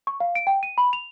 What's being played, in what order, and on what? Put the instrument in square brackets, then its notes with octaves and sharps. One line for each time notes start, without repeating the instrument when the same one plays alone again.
[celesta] C#6
F5
D7
G5
D#7
B5
F7